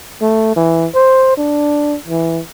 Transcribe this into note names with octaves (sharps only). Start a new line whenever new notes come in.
A3
E3
C5
D4
E3